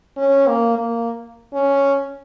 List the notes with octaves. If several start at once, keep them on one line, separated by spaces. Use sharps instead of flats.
C#4
A#3
A#3
C#4